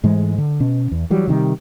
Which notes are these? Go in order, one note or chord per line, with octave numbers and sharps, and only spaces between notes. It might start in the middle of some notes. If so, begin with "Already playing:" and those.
G#2 E3 G#3 A3
D3
B2 C#4
E2
E3 F#3 G3
C3 D#3 F3 G3